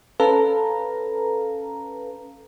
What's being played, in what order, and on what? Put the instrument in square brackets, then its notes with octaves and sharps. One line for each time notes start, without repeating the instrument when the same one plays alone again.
[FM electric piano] C#4 A4 B4 F5 A#5